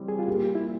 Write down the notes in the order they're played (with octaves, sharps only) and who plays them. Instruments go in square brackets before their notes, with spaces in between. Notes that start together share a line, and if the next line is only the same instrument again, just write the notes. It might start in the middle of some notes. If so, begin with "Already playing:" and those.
Already playing: [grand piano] C#3 E3 G3 C4
[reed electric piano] G#4
F4
[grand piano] A#2 [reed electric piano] G4
[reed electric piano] E4